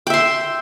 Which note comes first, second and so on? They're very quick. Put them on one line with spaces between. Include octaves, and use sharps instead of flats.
G5 E5 C6